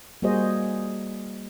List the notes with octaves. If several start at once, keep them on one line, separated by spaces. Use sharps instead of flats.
G3 A#3 F#4 G#4 C5 D#5